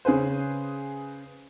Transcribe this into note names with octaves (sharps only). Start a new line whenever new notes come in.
C#3 G#4 B4 C5